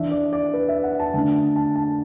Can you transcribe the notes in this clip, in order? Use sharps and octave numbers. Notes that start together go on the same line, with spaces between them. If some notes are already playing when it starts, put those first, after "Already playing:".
Already playing: E3 D4 E5
D5
D5
B4
E5
F#5
A5
D3 A3 D4 A5
A5
A5
A5